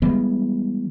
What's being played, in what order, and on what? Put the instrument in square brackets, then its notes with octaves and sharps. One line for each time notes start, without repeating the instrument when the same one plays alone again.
[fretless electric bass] E3 G3 G#3 B3